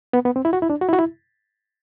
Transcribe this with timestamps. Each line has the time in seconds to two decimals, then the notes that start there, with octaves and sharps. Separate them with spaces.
0.13 B3
0.25 B3
0.36 C4
0.45 E4
0.53 F#4
0.62 E4
0.70 D4
0.81 F#4
0.89 E4
0.93 F#4
0.99 E4